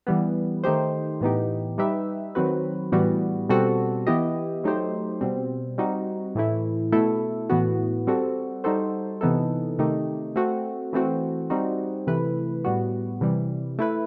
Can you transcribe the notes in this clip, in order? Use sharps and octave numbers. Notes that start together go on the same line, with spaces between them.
E3 G3 B3
D#3 A3 D#4 G4 C5
A2 E3 B3 D#4 G4
G3 D#4 G4 B4 E5
D#3 F#3 C4 F#4 B4
A2 E3 G3 B3 F#4
B2 G3 C4 F#4 A4
E3 B3 E4 G4 D#5
F#3 A3 D#4 G4 C5
B2 G3 C4
G3 C4 D#4 F#4
A2 E3 A3 E4
B2 A3 E4 A4
A2 E3 B3 F#4
G3 C4 F#4 A4
G3 D#4 F#4 A4 C5
C3 E3 B3 D#4 A4
C3 D#3 A3 D#4 G4
A3 C4 F#4
E3 A3 C4 F#4
G3 C4 D#4 F#4
C3 E3 A3 E4 B4
A2 G3 B3 F#4
C3 E3 G3
A3 E4 B4